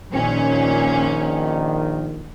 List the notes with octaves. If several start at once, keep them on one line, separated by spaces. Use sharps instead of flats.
A#1 A#2 D#3 C#4